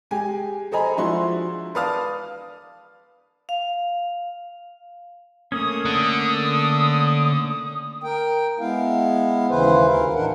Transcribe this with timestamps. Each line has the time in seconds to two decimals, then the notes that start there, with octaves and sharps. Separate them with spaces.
0.11 G#3 G4 G#5
0.72 A4 C5 D#5 G#5 A#5 B5
0.97 F3 G#3 D4 E4 F#4 C6
1.75 B4 D5 F5 A5 D#6 F6
3.49 F5
5.52 A3 A#3 C#4 D#6
5.85 D3
8.04 A#4 G5
8.59 G#3 B3 E4 F5
9.49 D#2 C#3 E3 E4 B4 C5
9.88 D2 A#4 F5
10.14 A2 E3 D4 D#4 A#4 F#5